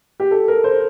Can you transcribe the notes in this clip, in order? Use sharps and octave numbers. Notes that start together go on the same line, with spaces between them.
G4
A4
A#4
C5